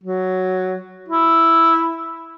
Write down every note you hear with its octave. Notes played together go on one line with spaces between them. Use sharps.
F#3
E4